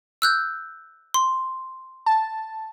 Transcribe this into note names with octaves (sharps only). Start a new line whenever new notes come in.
E6 F#6 G6
C6
A5